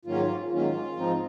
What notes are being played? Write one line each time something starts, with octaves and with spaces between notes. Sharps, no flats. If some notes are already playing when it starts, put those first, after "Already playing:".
G#2 D#3 F#3 A#3 C#4 F4
G#2 D#3 F#3 A#3 C#4 F4
G#2 F3 C4 D#4